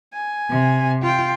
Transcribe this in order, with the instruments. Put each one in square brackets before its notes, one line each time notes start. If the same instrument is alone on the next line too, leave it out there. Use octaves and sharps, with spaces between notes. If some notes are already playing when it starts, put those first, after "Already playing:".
[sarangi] G#5
[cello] C3
[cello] F4 [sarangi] G5